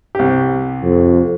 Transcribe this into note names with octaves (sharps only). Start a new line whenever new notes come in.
C2 G4
F2